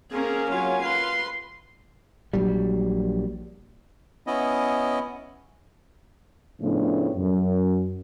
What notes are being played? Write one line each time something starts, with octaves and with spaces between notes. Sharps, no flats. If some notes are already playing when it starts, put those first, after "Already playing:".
A#3 C4 C#4 G#4 A#4
F#3 F4 C#5 G#5
B4 C6
A#1 F#3 G3
B3 C#4 E4 D#5
A2 C#3 F3 A3 B3 D4
F#2